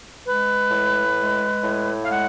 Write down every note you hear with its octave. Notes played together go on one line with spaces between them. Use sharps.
G#3 B4
A2
G#3
A2
F5
G#3 F#5